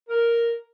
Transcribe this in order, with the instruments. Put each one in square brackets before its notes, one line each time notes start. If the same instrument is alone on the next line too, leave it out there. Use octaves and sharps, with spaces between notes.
[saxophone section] A#4